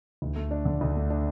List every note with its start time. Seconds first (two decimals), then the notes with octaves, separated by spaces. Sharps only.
0.22 D2
0.36 A3
0.51 D4
0.65 D3
0.81 D2
0.95 A3
1.10 D4